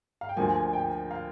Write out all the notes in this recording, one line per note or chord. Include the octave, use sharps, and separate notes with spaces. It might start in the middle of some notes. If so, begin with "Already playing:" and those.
F5
G5
D2 D3 F3 A#3 G#5
G#5
G5
F5